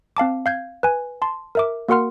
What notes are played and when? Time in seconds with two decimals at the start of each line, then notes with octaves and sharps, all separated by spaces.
0.17 C4 F5 A5 D6
0.46 F5 G6 G#6
0.83 B4 G#5
1.22 A5 C6
1.55 A#4 E5 D6
1.88 A#3 F#4 A#4 F#5 C6 F6